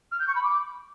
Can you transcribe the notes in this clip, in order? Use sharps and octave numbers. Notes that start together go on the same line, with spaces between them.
F6
G6
C#6
B5
D6